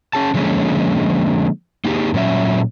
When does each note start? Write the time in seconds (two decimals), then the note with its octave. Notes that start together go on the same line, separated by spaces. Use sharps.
0.13 C#4 G#4 A5
0.34 D3 F3 G#3 A#3 C#4
1.85 A#3 D#4 F4 G4 G#4
2.14 A#2 F#3 C#4 E5